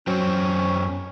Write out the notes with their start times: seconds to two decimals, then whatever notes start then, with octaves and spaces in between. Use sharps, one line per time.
0.07 F#2 F#3 C#4 C5 G5 C#6